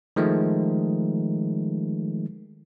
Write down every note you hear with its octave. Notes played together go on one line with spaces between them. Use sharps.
D#3 F3 G#3 A3